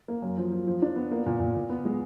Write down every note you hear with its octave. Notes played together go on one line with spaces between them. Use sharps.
A#3
F#2
F3
F3
F3
D4
B3
A#3
A#2
A#2
A#2
B3
G#3